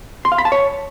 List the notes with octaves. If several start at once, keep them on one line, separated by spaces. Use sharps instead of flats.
C6
F5
B5
A5
C#5